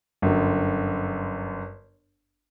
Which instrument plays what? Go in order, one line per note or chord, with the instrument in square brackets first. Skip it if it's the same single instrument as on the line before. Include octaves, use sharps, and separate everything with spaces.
[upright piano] G1 F#2